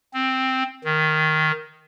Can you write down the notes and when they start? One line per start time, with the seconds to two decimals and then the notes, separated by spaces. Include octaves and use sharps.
0.14 C4
0.84 D#3